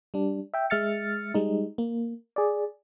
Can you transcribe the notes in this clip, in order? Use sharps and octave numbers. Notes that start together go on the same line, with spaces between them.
G3 D4
E5 G5
G#3 E5 F6 A6 C#7
G3 G#3 D#4
A#3
G#4 D5